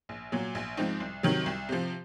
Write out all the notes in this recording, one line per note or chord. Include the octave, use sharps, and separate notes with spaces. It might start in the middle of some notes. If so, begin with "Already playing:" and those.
A#1
A#2 F#3
A#1
G#2 F3 C4 D#4
C2
C3 D#3 F#3
C2
C3 F3